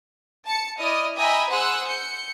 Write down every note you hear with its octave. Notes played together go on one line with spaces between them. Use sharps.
A5 C#7
E4 D5 D#5 D#6 F6
D#5 E5 G5 G#5 A#5 B5
G#4 C5 F#5 E6 F#6
G6 C#7